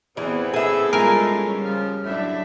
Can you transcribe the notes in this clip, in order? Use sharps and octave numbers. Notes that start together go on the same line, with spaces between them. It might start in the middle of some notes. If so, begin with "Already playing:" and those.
E2 E3 B3 C4
A2 C#3 A3 G#4 E5
G3 G#3 F4 A#4 G#5
G3 C#4
C#3 F3 F4
F#2 A2 F#3 D4 E5